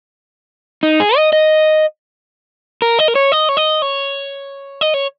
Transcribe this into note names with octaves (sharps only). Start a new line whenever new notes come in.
D#4
G#4
D#5
D#5
A#4
D#5
A#4
C#5
D#5
C#5
D#5
C#5
D#5
C#5